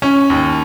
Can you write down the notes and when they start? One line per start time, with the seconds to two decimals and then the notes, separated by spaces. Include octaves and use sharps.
0.02 C#4
0.30 D#2